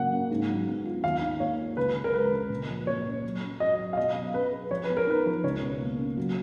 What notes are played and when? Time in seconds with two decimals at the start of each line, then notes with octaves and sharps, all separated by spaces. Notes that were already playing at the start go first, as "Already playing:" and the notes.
Already playing: C#3 F#3 A#3 F#5
0.12 C#4
0.31 G#2
0.48 F#3
0.67 B3
0.86 F4
1.03 D#2 F5
1.22 D#3
1.40 A#3 C#5
1.59 F4
1.77 C#2 B4
1.95 C#3
2.04 A#4
2.13 G#3 B4
2.32 C#2
2.50 A#2
2.69 F3
2.87 A#3 C#5
3.05 C#4
3.24 F#3
3.43 C#4
3.60 F#4 D#5
3.78 F#3
3.93 F5
3.97 B2 D#5
4.16 F#3
4.34 C#4 B4
4.52 G#4
4.71 F3 C#5
4.84 B4
4.89 B3
4.97 A#4
5.07 D#4 B4
5.26 F3
5.44 C#2 C#5
5.62 B2
5.81 A#3
5.99 C#4
6.17 F#3